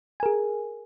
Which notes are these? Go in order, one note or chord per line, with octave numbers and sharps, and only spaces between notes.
G#4 A#4 G#5